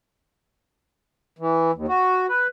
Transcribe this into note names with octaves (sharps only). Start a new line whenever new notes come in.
E3
D#2
F#4
B4